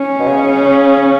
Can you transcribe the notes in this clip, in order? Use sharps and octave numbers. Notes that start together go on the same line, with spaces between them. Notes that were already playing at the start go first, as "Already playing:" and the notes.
Already playing: C#4
B2
C#3